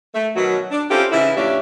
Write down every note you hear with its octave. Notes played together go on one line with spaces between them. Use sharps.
A3
B2 D#3 F#3
D4
C4 C#4 E4 F4 G4 A4
G#2 C#3 E3 E4
F2 A2 C#4 D4 G4 E5